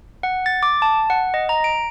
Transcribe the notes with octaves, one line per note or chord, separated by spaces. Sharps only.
F#5
A6
D6
A5
F#5
D#5
A#5
D7